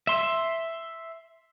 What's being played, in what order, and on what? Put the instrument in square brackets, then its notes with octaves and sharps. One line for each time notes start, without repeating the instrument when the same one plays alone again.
[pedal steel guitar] E5 C6